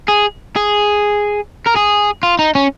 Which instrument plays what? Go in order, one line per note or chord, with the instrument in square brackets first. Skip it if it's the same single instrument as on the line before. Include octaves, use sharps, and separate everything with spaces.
[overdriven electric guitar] G#4
G#4
A#4
G#4
F4
D#4
C#4